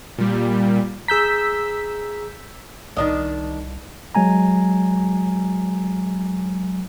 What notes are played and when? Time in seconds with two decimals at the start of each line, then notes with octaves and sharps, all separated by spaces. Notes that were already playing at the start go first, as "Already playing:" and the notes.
0.18 A#2 G3
1.08 G#4 A#5 E6 G6 B6
2.97 C2 D#3 D4 D#5
4.15 F#3 G#3 G#5 A#5